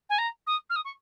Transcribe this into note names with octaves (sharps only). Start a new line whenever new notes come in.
G#5
A#5
D#6
F6
D#6
C#6